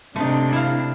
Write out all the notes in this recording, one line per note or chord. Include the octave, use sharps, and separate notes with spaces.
C3 A3 D4 D#4
E4 F5